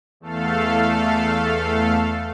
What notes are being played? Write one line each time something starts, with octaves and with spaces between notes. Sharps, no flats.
E2 A3 A4 F5